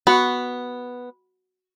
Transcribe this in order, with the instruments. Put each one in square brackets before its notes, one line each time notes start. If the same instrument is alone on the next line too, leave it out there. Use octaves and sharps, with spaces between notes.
[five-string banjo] B3 [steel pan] F#4 F#5